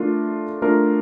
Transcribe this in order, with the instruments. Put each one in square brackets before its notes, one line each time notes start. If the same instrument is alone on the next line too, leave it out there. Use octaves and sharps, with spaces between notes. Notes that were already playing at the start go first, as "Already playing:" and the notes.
Already playing: [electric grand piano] A3 D4 F4 A#4
A3 D4 F4 A#4